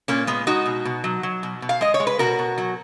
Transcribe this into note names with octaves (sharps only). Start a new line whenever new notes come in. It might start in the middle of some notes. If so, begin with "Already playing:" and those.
A#2 A#3 C#4
G#3 B3
G#3 D#4 F#4
B2
B2
F#3
F#3
B2
B2
F5
G#3 D#5
C#5
G#3
B4
B2 F#4 A#4
B2
F#3